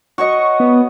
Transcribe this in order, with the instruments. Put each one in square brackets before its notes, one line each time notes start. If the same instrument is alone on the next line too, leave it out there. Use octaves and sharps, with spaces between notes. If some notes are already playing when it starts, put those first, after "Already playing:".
[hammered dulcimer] F#4 C#5 D#5 [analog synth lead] C#6
[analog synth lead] B3